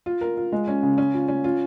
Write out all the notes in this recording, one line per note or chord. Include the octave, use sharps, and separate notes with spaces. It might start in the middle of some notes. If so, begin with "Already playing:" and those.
F4
A#4
F4
G#3
C#4
C#3
C#4
F4
C#4
F4